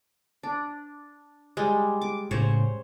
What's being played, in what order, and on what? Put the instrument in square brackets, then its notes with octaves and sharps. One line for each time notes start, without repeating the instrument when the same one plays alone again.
[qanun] D4
G3 G#3
D6
[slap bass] A2 C#3 [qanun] C5 C#5